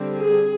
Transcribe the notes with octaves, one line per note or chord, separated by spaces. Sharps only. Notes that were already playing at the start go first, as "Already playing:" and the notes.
Already playing: D3 G3 C4
G#4